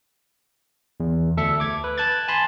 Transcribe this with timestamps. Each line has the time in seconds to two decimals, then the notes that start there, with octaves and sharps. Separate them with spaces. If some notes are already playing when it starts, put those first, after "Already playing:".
1.00 E2
1.37 D2 A4 E5 C#7
1.60 D6 G#6
1.84 B4
1.98 A5 F#6 G#6 A6
2.28 G#5 A5 B5 C6